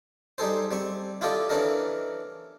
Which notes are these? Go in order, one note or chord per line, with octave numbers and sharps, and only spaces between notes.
G3 D#4 G#4 A4 C5
G3 C4 C#6
E4 F4 G4 A4 D5 D#5
E3 C#4 D4 A4 A#4 D#5